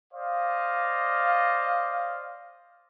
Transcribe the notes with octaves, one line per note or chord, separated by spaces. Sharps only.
C5 D5 D#5 F5